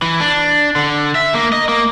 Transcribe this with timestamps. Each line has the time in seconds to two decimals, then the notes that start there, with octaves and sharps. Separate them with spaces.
0.02 E3
0.20 D4
0.76 D3
1.15 E5
1.34 A#3
1.53 D#5
1.69 A#3